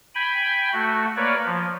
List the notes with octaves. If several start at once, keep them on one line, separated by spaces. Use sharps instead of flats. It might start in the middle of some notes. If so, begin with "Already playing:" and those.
G5 G#5 B5
A3 F#4
A#3 B4 C#5 D5
F3